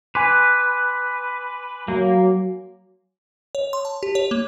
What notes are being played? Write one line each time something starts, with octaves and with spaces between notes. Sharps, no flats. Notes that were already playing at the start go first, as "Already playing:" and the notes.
B4 G#5 C6 D6
F#3 A#3
C#5
C6
A5
G4
C#5
A#3